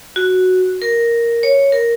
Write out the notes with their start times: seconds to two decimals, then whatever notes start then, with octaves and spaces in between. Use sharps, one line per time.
0.16 F#4
0.82 A#4
1.43 C#5
1.72 A#4